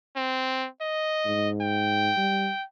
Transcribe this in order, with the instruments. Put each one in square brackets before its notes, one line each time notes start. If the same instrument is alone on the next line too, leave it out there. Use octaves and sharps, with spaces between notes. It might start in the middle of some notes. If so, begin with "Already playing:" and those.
[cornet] C4
D#5
[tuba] G#2
[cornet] G5
[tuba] G3